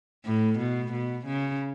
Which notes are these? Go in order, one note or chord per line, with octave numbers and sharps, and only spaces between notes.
A2
B2
B2
C#3